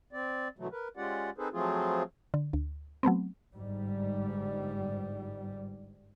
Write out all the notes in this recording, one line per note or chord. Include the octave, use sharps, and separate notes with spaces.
C4 D5
B2 D3 E3 F#3 A3
A#4 B4
G#3 C#4 F4 G4 D5 F#5
C4 D#4 G#4 A4 B4 C5
F3 F#3 A3 C4 F4 G#4
D3
D2
F#3 A3 B3 C4
G1 G#2 G3